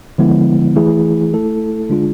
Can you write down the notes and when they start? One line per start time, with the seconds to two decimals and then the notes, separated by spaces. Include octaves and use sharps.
0.18 D3 F3 G#3 B3 E4
0.76 E3 A3 E4 G#4
1.33 A3 E4 A4
1.90 D3 G#3 D4 F4 G#4